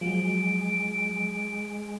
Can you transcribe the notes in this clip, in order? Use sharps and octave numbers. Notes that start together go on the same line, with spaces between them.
F3 F#3 G#3 D7